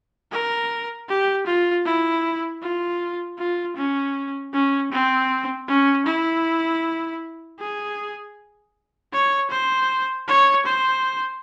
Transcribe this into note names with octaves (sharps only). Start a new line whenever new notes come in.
A#4
G4
F4
E4
F4
F4
C#4
C#4
C4
C#4
E4
G#4
C#5
C5
C#5
C5